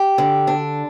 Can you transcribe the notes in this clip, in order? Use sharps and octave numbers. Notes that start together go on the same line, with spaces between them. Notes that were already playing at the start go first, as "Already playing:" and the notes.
Already playing: G4
D3
D4